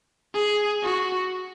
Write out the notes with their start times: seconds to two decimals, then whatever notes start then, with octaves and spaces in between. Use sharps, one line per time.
0.34 G#4
0.83 F#4